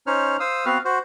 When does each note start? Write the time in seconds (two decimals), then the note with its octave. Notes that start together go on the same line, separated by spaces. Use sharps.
0.07 C#4 D#4 C5 C#5 F6
0.40 C5 F5 D#6 E6
0.66 B3 C4 F#4 B4 F5 F6
0.85 F#4 C5